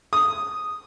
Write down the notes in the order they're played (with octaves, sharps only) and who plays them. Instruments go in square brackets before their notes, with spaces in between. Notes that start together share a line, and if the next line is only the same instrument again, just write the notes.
[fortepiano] D#6